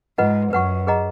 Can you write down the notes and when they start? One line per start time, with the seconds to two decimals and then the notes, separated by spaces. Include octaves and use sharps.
0.18 G#2 F4 B4 D#5 F#5
0.52 F#2 B4 F#5 C#6
0.87 G#4 B4 D#5 F#5 A#5